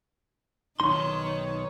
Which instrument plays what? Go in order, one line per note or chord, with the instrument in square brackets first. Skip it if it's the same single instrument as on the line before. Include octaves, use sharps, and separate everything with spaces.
[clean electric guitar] B1 D#4 C6 [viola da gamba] D#3 C#5